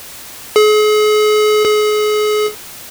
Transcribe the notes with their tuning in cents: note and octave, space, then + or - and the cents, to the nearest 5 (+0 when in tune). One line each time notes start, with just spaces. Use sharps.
G#4 +40
G#4 +35